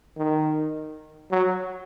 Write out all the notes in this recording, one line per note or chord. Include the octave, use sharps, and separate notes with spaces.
D#3
F#3